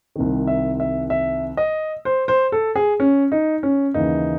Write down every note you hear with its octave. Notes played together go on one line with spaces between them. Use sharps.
C2 C3 D#3
E5
E5
E5
D#5
C5
C5
A4
G#4
C#4
D#4
C#4
D#2 C#3 E3 D#4